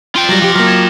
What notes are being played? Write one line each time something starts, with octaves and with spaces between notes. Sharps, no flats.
F4 G5
F#3 G3 A#6 F#7
F3 G4 D6
F#3 A#3 F6 A#6
G#6 A6 E7